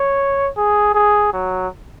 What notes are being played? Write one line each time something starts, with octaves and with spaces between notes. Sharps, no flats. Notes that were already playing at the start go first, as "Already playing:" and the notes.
Already playing: C#5
G#4
G#4
F#3